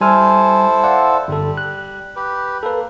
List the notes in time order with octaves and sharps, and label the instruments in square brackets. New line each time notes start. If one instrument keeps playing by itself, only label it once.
[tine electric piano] G3 G#5 F6 [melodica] E4 A4 C5
[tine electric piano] D5 F5 F#5
[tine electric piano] G1 A4 [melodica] G3
[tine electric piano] F#6
[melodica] G4 B4
[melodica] A#3 [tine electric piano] A4 B4